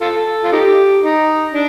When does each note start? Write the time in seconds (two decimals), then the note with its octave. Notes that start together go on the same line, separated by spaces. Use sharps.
0.01 F4 A4
0.44 F4
0.52 D#4 G4
1.03 D#4
1.53 D4